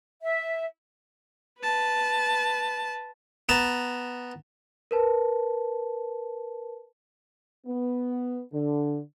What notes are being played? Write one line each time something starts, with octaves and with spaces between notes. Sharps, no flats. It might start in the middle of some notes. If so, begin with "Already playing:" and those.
E5
B4 A5
B3 A5 A#5
A#4 B4 A5
B3
D3